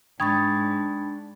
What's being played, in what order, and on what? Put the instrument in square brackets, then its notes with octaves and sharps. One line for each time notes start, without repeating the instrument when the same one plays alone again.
[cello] G#2 [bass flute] D4 [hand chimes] G5 B5 A6 [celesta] C#6 D#6 G#6